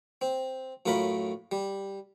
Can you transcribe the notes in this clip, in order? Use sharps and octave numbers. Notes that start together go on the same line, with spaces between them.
C4
F#2 A2 F4 A#4 B5
G3